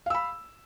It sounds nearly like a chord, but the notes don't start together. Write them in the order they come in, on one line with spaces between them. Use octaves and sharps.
F5 E6 B5